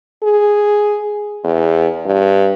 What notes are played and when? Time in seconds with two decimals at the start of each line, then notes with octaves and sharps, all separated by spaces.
0.24 G#4
1.44 E2
2.06 G2